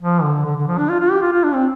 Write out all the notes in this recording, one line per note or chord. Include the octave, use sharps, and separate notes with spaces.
F3
D3
D3
D3
F3
D4
F4
F4
G4
F4
F4
D4
C4